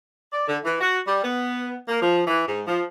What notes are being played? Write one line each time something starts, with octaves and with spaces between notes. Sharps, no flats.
D5
D3
E3
F#4
G3
B3
A#3
F3
E3
G#2
F3